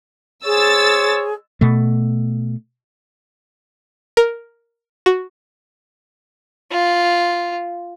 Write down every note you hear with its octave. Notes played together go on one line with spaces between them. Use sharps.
G#4 C5 C#5 E6 A6
B2 A3
A#4
F#4
F4